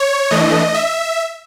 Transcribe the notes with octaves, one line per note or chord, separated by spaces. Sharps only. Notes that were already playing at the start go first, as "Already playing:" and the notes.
Already playing: C#5
E3 A3 D4 D#5
E5